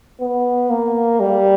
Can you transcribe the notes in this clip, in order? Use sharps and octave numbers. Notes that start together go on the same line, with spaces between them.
B3
A#3
G3